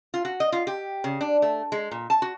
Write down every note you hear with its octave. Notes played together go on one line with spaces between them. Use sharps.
F4
F#4
D#5
F4
G4
C#3
D4
A3
G#3
A#2
A5
F#4